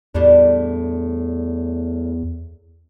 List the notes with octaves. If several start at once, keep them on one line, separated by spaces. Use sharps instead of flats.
E2 A2 G3 D4